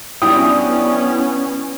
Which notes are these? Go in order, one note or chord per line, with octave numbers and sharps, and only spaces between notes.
F#3 B3 C#4 D4 E4 G4 G5 D#6